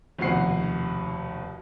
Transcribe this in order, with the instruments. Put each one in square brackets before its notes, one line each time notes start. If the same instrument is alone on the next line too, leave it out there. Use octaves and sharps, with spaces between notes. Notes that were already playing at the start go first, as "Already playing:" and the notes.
[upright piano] F1 D#2 B2 F#5 C7